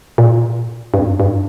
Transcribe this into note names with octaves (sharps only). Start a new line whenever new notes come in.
A#2
G2
F2
G2